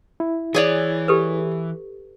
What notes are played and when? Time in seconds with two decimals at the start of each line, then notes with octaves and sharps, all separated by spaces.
0.20 E4
0.54 E3 G#4 C#5 D5
1.08 G4 A4 B4